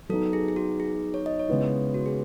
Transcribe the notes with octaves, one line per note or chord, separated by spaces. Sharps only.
F#3 B3 D#4 A4
G#4
G#4
F#4
G#4
C#5
D#5
C#5
C#3 G#3 B3 E4
F#4
G#4